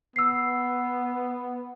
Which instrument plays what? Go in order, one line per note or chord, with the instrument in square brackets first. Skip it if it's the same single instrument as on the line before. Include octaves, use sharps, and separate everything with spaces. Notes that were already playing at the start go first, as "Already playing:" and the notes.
[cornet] B3 [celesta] E6 C7